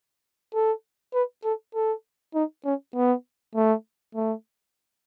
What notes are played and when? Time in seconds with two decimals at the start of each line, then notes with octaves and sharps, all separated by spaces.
0.54 A4
1.14 B4
1.44 A4
1.75 A4
2.34 D#4
2.65 C#4
2.96 B3
3.55 A3
4.15 A3